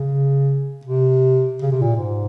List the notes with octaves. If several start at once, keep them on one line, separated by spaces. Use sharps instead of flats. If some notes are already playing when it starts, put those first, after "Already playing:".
Already playing: C#3
C3
C#3
C3
A#2
G#2